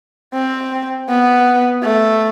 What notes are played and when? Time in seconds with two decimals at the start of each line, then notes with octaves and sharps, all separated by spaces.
0.34 C4
1.09 B3
1.83 A3